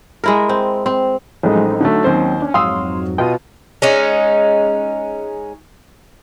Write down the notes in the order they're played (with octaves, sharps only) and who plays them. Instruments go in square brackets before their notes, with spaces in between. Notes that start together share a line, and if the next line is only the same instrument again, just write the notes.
[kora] G#3 E4 A#4
C4
C4
[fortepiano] A1 [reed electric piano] F3 F#3 G#3 [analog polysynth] C4 D#4
[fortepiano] D3 F#3 A3 [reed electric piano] D#4
[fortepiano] D#2 C5 [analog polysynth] F#3 C4 C#4
[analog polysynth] C#4 [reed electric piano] D4
[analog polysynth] F2 G#2 F#3 [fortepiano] F5 D#6 E6 [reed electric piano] C6
[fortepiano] B2 F4 [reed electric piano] D#5 G5 [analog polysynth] D#6
[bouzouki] G#3 C#4 D#4